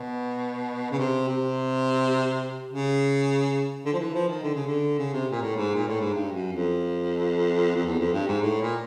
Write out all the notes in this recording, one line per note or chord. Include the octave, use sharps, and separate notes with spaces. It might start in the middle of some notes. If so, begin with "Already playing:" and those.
Already playing: B2
C#3
C3
C3
C#3
D3
F3
E3
F3
D#3
D3
C#3
D3
C#3
C3
A#2
A2
G#2
A#2
A2
G#2
G2
F#2
F2
F2
E2
F2
G2
G#2
A2
A#2